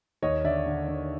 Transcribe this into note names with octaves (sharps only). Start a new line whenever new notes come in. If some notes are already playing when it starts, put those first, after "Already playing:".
D#2 C#5 D#5
D3 D5 E5
D3
D3